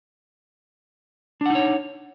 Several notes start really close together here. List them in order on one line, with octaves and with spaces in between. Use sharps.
D4 F#5 D#4 C#5